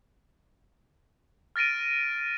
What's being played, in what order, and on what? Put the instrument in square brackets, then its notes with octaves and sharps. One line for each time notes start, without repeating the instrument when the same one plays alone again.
[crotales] F6 A6 A#6 D7 D#7